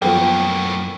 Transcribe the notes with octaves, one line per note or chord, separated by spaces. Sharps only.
F#2 A2 F3 A#3 B3 A4 G5